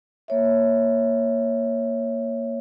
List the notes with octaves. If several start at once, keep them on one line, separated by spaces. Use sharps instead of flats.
A#3 C#5 E5